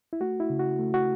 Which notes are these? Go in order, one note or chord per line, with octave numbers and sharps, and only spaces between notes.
E4
A3 F#4
E4
C#3
F#4
A3
F#4